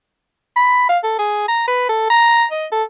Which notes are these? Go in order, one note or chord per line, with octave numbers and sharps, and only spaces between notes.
B5
F5
A4
G#4
A#5
B4
A4
A#5
D#5
A4